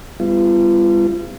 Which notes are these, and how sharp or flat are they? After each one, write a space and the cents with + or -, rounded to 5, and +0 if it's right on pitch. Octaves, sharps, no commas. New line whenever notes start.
G3 +40 B3 +35 F4 -35